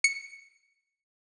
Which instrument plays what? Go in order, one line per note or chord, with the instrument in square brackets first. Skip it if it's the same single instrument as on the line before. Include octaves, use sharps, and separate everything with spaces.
[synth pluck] C#7